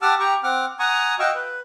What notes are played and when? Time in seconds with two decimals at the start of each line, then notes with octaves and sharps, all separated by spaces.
0.02 G4 F#5 A5 D6 E6 F6
0.20 G4 G5 A#5 C#6
0.44 C4 F#5 D6 F6
0.79 F#5 G#5 A#5 C#6 D#6
1.19 F#4 D#5 F5 G5 C#6 E6
1.35 B4